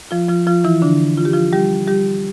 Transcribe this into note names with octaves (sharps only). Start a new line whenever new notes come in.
F3 F4
F3 F4
F3 F4
E3 E4
D3 D4
F4
G4
F3 F4
G3 G4
G3 G4